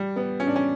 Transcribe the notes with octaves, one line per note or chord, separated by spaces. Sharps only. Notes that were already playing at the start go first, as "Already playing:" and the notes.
Already playing: G3
B3
C#4
D4
C#4